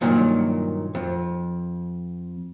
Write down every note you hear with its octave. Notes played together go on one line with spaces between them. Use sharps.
G2 A#2 D#3 F#3
F2